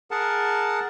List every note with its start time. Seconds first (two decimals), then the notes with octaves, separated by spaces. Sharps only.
0.11 G#4 A#4 F#5 A5